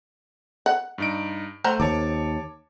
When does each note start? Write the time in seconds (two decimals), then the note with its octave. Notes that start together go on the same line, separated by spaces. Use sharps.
0.66 F#5
0.98 G2 D#4 D7
1.64 A3 C5 F#5 A#5
1.80 D#2 C#5 A5 D6